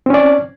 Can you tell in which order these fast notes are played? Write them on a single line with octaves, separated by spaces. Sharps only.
C4 C#4 D5